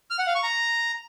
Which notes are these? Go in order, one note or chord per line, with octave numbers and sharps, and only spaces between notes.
F6
F#5
F5
C#6
A#5